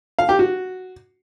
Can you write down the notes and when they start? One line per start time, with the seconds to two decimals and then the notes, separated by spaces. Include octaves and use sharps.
0.19 F5
0.29 G4
0.39 F#4